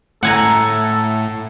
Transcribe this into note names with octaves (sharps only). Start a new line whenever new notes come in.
A2 A4 F#5 G#5 A#5